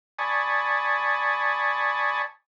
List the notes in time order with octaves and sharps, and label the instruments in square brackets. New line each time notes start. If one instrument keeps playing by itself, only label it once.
[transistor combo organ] D5 G#5 A5 B5 C#6 D#6